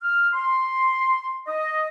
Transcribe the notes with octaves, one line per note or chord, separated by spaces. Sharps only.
F6
C6
D#5